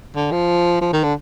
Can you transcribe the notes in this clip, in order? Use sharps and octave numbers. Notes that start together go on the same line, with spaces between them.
D3
F3
F3
D#3
D3